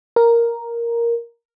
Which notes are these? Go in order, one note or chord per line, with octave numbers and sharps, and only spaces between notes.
A#4